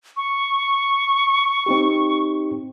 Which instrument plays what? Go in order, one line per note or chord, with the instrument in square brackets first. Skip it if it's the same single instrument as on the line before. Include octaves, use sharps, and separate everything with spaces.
[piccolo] C#6
[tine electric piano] C4 D#4 G4